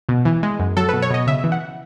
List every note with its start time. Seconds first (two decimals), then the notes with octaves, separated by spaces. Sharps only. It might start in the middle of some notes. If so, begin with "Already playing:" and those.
0.09 B2
0.25 E3
0.43 G#3
0.60 F#2
0.77 F#3 A4
0.89 B2 B4
1.02 C#5
1.11 B2 D#5
1.27 C#3 E5
1.44 E3
1.52 F#5